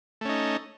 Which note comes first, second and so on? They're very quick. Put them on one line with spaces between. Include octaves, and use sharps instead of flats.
A3 C#4 D#4